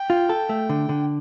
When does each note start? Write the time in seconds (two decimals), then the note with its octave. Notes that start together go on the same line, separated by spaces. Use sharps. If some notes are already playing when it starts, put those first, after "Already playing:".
Already playing: G5
0.10 F4
0.29 A4
0.49 A3
0.69 D3
0.89 D3